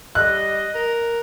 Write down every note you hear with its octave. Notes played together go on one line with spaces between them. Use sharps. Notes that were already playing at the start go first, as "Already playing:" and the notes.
G3 D#5 F#6
A#4